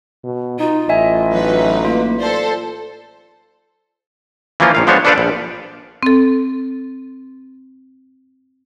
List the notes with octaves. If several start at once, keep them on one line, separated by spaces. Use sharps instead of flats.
B2
D#4 F4
A1 D#5 E5 G#5
F#3 D#4 B4
A#3 F4
A4 C5 D5
E3 F3 A#3 C#4 F4
A#1 A#2 F5
F3 G#3 B3 D4 C5 C#5
D4 A4 B4 C5 D5 F5
A#1
C4 A4